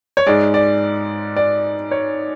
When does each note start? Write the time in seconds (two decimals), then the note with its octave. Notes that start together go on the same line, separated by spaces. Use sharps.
0.17 C#5
0.27 G#2 G#3 D5
0.54 D5
1.36 D5
1.91 C#5